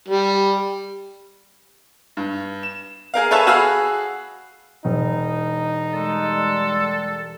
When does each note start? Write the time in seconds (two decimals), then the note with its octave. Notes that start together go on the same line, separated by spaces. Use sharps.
0.08 G3
2.17 G2
2.63 E7
3.14 G#4 A#4 F5
3.31 A4 B4 C#5 E5 G#5 A5
3.47 F#4 G#4 F5 B5 E6
4.85 E1 D#4
5.93 G3 G#3 A4